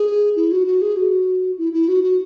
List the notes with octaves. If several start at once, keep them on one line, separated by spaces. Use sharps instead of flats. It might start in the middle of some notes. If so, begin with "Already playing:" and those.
Already playing: G#4
E4
F#4
F#4
G#4
F#4
E4
E4
F#4
F#4